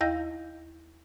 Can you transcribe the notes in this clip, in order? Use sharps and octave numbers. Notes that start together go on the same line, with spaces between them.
D#2 E4 D#5 F5 G6 A#6